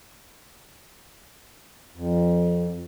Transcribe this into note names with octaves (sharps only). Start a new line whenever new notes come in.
F2